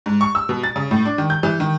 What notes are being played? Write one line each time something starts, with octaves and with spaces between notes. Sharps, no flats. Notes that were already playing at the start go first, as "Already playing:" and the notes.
G#2
C#6
E6
B2
A6
C#3
A2
D4
D#3
G6
E3
D#3